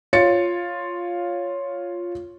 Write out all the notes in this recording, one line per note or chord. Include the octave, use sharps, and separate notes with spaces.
F4 C#5 A6 C#7